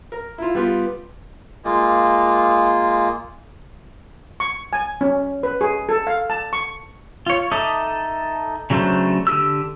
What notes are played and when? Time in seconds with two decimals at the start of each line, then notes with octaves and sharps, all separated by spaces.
0.12 A#4
0.38 E4 F4
0.55 G3 B3 F4 G4
1.65 G#3 A#3 F4
4.40 C#6
4.73 G#5
5.01 C#4
5.43 B4
5.61 G#4
5.89 A4
6.07 F5
6.30 A5
6.53 C#6
7.26 F4 C#5
7.52 D#4 A4 E5 D6 D#6
8.70 C#3 F#3 A3 D4 C5
9.27 D3 G4 E6